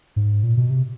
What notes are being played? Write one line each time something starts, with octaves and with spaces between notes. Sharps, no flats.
G#2
A#2
B2
C3